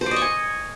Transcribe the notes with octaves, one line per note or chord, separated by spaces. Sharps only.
C5
D5
D#5
C#6
G#5